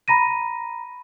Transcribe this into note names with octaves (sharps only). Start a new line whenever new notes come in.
A#5 B5 A#6 D#7